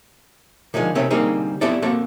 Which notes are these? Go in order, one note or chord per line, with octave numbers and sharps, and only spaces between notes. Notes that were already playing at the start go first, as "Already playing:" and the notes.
D3 D#3 F3 G#3
C3 D#3 A3 C4 C#4
D3 G3 A#3 C4 D#4 G#4
B3 C4 E4 G4 A4 D5
A#3 C4 F#4 A4